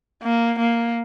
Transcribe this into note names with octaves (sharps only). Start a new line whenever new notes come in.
A#3
A#3